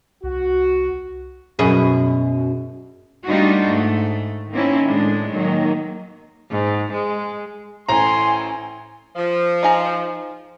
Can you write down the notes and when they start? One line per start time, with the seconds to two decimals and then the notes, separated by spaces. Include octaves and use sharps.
0.24 C2 F#4
1.59 F#2 B2 G#4
3.26 G3 A3 D4 D#4 F4 F#4
3.66 G#2 A3
4.51 D#3 A#3 C4 C#4 E4
4.87 A2 G#3 D4
5.34 D#3 F#3 G#3 A#3
6.50 G#2
6.92 G#3
7.88 A1 A2 C5 G#5 A#5 C6
9.16 F3
9.63 D#4 G#4 A#5